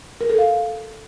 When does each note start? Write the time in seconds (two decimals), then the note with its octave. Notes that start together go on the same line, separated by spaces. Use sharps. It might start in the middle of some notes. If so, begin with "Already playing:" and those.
0.21 A#4
0.30 A4
0.39 F5